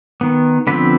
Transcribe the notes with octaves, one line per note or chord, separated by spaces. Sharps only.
D#3 B3
D3 F3 B3 C4 B4